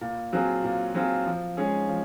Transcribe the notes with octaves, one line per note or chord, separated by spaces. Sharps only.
A#2
F#3 C4 F4 G#4
A#2
F#3 C4 F4 G#4
F3
G#3 C#4 G#4
F3